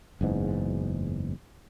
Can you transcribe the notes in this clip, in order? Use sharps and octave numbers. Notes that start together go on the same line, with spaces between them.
F#1 E2 G#2